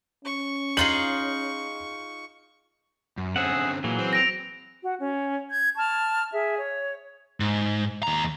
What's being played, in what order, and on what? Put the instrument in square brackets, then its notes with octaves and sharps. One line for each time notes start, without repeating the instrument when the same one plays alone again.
[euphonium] C#4 [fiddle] C#6
[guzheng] D#4 F4 G#4 [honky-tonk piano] F#7
[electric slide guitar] F#2
[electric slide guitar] D3 C4 C#4 [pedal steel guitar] G#4 E5 F#5
[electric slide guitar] A#2 [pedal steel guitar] E3 F#3 G#4
[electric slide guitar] C4
[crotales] A#6 D7 F7
[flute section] F#4
C#4
G6 G#6
A5 C#6 F6
G#4 E5
C#5
[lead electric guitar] G#2
D#2 A#5